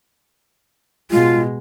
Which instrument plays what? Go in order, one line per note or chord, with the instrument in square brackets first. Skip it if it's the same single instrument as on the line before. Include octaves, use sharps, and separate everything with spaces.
[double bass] B2 G#3 [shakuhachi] F4